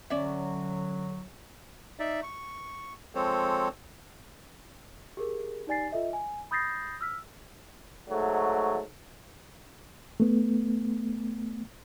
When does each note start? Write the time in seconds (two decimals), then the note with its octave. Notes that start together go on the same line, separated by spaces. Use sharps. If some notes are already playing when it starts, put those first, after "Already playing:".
0.10 D3 F#3 C#4 D5 E5
1.99 D#4 D5 E5
2.23 C#6
3.15 F3 G#3 C4 A4 C5 C#5
5.17 G4 G#4 A#4
5.67 D#4 G4 D5 G#5 A6 C7
5.92 F4 A4 D#5 E5
6.13 G#5
6.51 B5 D#6 G6 A6 A#6 C7
7.01 E6 F6 B6
8.09 G#2 F#3 A3
10.20 A3 B3